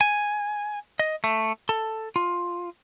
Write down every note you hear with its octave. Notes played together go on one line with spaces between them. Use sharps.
G#5
D#5
A3
A4
F4